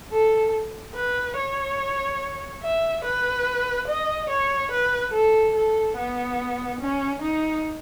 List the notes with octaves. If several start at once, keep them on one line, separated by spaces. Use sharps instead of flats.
A4
B4
C#5
E5
B4
D#5
C#5
B4
A4
A4
B3
C#4
D#4